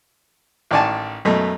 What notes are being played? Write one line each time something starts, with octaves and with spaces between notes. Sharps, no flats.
A1 D#3 D5 G#5 A5
F#2 B2 A3